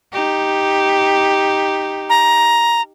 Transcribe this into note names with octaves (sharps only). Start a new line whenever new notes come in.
D#4 G4
A#5